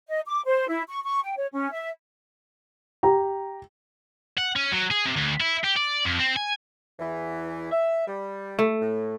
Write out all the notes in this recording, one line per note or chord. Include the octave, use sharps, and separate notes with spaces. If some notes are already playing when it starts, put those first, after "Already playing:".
D#5
D6
C5
E4
C#6
C#6
G5
C#5
C#4
E5
G4 A#5
F#5
C#4
F#3
G#4
C3
D2
E4
G4
D5
F2
C4
G#5
E2 E3
E5
G3
A3
A2